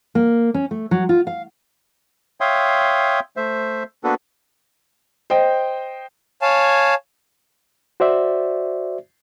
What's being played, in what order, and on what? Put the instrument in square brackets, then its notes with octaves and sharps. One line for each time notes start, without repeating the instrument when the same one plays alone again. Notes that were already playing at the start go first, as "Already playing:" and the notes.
[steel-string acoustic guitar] A#3
C#4
A3
F#3
F4
F5
[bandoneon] C#5 E5 F5 G5 C6 D#6
A3 C5 E5
A#3 B3 D4 F#4 A4 B4
[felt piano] C5 D#5 G5
[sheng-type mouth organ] C#5 F5 G#5 A5
[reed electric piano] F#4 C5 D5 E5